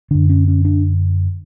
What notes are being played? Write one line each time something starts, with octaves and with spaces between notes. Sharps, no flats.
F#2 D3 D4
C#4
C#4
D4